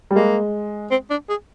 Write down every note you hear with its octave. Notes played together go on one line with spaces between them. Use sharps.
G3
G#3 A#3
C4
D4
G#4